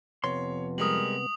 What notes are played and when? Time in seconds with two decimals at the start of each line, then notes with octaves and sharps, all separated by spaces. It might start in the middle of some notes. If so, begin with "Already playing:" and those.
0.24 F2 C3 B3 C#5 C6
0.78 G3 G#3 A#4 D#6 F7 F#7